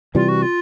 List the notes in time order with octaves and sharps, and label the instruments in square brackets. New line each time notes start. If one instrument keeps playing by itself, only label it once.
[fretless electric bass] C3 E3 G3 [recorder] F4
[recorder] F#4
F4